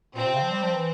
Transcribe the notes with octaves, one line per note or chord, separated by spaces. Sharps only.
A#2 C4
C3
C#3
F3
G3
F3
E3